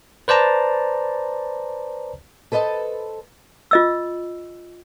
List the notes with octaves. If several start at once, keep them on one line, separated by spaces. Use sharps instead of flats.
B4 C5 D5 A5 A#5
A4 B4 C5 D#5 A5
F4 D#5 E6